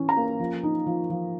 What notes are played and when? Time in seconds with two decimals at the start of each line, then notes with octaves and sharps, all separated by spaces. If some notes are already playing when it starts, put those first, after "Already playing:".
Already playing: E3 C#4
0.09 A#5
0.17 A#3
0.40 F3
0.63 D#4
0.87 F3
1.10 F3